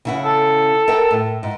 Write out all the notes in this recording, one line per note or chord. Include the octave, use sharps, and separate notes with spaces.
C#3 E4 F#5
A4
A#4 F#5 G5
A2
G#2